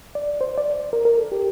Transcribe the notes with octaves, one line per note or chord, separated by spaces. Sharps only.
D5
C5
D5
A#4
A#4
A4
G4